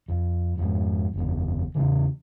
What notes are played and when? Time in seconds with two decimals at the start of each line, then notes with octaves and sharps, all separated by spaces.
0.08 F2
0.58 F2 G#2
1.14 F#1 E2
1.75 E2 C#3 E3